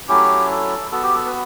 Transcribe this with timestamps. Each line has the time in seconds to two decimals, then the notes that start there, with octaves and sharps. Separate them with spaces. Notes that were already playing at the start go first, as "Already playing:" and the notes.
0.09 F#3 A3 C#4 E4 G4
0.51 A4
0.91 B3 F#4 A4
1.03 G4
1.15 A4
1.26 B4